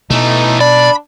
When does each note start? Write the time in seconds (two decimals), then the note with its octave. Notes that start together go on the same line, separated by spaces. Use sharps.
0.10 B2 E3 A3 D#4
0.61 D4 D5 B5